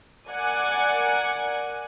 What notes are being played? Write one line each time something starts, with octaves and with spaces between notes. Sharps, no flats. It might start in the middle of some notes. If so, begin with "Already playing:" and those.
A#4 D5 F#5 G#5